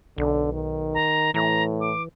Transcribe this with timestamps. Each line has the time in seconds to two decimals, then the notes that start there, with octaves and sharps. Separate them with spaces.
0.18 B1 D3
0.53 D#3
0.94 A#5
1.34 A2 E3 A#5
1.81 D6